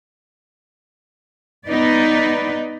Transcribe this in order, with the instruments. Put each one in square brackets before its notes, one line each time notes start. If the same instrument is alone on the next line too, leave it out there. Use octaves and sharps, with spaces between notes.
[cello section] B3 D#4 B4 D5